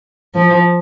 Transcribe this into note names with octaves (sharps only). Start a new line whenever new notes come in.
F3